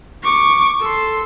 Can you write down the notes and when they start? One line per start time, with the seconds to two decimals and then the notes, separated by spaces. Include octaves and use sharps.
0.23 C#6 D6
0.81 A4 C6